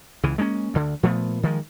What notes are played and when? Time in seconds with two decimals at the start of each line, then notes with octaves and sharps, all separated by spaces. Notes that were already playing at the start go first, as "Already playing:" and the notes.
0.23 C#2 C#3 E3
0.38 G#3 A#3 B3 C#4
0.74 D2 D3
1.03 A#2 F3 A3 B3
1.43 D#3 F3 G#3